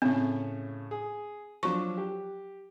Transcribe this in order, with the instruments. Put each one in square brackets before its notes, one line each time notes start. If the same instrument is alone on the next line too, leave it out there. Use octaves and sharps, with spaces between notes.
[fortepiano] A2 C#3 [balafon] C4
[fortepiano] G#4
[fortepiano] F3 F#3 D4 [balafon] C#6
[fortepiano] G4